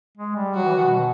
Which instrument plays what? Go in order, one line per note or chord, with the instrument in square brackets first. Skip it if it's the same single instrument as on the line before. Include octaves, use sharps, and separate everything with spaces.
[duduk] G#3
G3
[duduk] F#3 [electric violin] F#4
[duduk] E3
D#3
B2